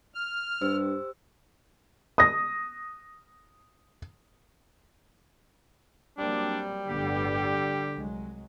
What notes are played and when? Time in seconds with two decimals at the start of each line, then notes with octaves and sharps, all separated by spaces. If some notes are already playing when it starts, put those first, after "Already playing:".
0.15 F6
0.61 G2 G4 C5 E6
2.18 D#6 A#6
6.18 F#3 G3 A#3 C4 D4
6.88 G1 A2 D3 B3 G4
7.95 C2 F#3 G#3